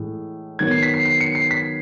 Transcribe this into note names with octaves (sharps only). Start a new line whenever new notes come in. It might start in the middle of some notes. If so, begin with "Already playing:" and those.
Already playing: A2 E3 G#3
D#3 F#3 B3 G#6
C7
B6
C7
C7
C#7
C7
B6